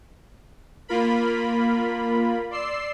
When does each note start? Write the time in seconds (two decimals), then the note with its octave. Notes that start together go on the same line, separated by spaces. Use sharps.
0.88 A#3 F4 A#4 B5
2.50 D5 C6 E6 C7